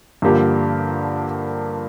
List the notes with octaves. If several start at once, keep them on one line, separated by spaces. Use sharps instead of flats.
G2 D3 F3 A#3 G4